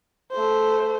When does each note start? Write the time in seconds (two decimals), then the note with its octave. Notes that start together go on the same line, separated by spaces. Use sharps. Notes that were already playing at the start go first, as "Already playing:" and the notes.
0.32 A3 C5